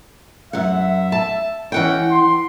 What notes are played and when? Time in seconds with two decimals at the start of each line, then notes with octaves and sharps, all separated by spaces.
0.53 F#2 E5 F#5
1.12 A5
1.72 E3 C#4 F#5 G5
2.11 C6